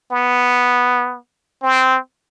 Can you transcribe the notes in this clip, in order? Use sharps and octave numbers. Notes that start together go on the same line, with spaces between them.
B3
C4